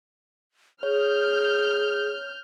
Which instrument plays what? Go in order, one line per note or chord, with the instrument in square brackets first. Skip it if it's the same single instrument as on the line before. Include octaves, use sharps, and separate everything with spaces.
[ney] G#4 [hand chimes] C#5 [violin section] F6 G6